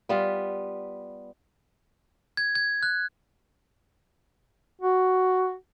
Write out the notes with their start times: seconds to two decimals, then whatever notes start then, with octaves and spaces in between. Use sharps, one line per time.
0.09 G3 B3 F4
2.37 G#6
2.55 G#6
2.83 F#6
4.81 F#4